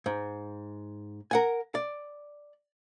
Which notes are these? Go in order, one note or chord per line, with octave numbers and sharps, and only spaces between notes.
G#2
A#4 F#5 G#5
D5